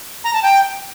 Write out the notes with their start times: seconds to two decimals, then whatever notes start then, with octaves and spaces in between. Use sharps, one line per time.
0.24 A#5
0.33 A5
0.43 G5